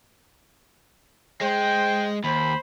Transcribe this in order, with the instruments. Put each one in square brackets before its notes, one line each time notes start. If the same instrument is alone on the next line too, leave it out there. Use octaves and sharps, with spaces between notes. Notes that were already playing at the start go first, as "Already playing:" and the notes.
[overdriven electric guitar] G#3 [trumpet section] C5 G5
[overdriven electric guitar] D#2 [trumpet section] C5 B5